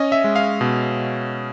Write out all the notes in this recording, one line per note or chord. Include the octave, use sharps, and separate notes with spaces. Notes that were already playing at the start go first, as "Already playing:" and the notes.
Already playing: C#4 D#5
E5
G#3
F5
B2